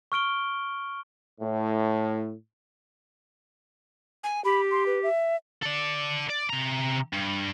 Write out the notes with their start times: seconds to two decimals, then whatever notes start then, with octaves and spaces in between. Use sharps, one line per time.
0.12 C#6 F6 D7 G7
1.41 A2
4.24 G#5
4.45 G4 B5
4.71 C6
4.86 B4
5.03 E5
5.62 A4 D5
6.30 D5
6.50 C3 A#5
7.13 G2